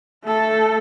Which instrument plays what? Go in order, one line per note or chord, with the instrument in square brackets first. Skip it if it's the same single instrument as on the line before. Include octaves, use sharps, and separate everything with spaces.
[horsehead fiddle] A3 A4